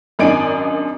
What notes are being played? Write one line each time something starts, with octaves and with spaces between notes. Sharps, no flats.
G#1 F#2 D4 D#4 G#5 D7